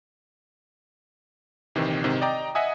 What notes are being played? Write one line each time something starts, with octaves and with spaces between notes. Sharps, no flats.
A#1 C3 D#3 E3
G#2 C3 D#3
D5 D#5 G5 A#5 D6
D#5 E5 F#5 G#5 D#6